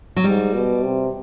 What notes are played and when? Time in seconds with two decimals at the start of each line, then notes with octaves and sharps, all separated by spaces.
0.16 F#3
0.24 G#2 G3
0.54 B2
0.84 C3